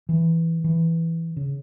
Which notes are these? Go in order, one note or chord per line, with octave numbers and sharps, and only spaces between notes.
E3
E3
C#3